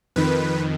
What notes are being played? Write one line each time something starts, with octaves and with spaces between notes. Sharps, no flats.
F2 D#3 B4